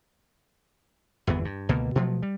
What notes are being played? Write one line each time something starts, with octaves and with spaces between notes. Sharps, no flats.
G1 E2 E3 B3
G2
C#2 B2 D3 A#3
B2 F3 F#3 A3
G3